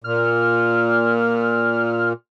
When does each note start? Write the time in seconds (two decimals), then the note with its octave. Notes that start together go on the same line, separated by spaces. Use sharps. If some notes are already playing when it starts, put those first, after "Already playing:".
0.04 A#2 F6